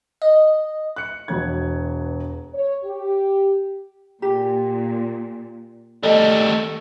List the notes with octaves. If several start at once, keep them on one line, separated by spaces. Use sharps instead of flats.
D#5
F#6 C#7
E1 E2 B2 F#3 G#6
C#5
G4
A#2 G4
D#3 G3 A3 A4 D#5